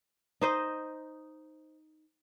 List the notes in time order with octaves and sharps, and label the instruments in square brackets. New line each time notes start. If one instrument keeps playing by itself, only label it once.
[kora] D#4 C5 D#5